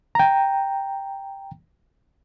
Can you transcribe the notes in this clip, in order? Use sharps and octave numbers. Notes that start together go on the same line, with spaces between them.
G5 A#5